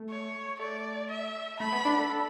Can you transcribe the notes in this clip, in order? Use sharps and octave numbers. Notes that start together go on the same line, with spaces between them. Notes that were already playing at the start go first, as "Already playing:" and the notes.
Already playing: A3
C#5
A3 D5
E5
A3 B5
B3
D4
A4
A4